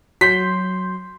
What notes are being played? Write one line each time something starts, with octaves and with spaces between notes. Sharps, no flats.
F#3 C6 G6 B6